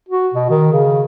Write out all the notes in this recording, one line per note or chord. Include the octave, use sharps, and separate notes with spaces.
F#4
B2
D#3
C#3